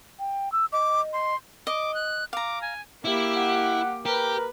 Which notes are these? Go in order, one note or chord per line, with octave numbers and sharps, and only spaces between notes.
G5
E6
D#5 D6
C6
D#5 D6
F#6
F5 A#5 D6
G#5
A#3 E4 G4
F#5
G4 A#4 B4